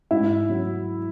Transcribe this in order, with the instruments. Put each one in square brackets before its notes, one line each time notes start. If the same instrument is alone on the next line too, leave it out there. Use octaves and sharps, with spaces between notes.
[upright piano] G#2 E4
F#3